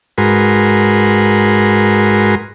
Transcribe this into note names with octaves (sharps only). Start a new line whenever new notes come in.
G#2 F#4 G#4 A#4 B4 C6